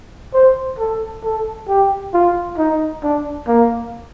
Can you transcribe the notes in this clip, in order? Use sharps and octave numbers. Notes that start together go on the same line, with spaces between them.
C5
A4
A4
G4
F4
D#4
D4
A#3